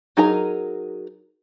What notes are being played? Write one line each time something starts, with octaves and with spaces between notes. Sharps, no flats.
F#3 D#4 G#4 A#4 A#5